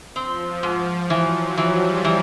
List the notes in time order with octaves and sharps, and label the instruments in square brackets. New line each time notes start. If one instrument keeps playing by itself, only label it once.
[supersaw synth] F3 [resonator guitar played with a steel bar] C4
[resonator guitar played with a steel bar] G#2
[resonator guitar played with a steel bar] E3 [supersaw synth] F#3
[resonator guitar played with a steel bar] E3 [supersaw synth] G3
[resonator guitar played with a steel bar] E3